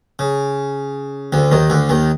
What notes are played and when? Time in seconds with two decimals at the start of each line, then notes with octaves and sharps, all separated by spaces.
0.19 C#3
1.33 D2 D3
1.52 D#2 D#3
1.70 D2 D3
1.89 D#2 D#3